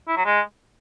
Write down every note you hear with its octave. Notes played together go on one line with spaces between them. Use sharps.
E4
F#3
G#3